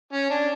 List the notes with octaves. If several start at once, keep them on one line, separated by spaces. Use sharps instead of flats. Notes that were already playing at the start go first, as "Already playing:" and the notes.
C#4
D4